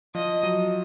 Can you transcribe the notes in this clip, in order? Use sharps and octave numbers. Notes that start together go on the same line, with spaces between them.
F3 D#5
F#3